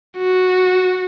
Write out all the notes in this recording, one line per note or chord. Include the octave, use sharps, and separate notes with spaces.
F#4